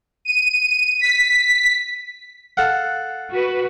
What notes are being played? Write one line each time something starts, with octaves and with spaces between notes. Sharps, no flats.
D#7
B6
A4 F5 F#5
F#4 B4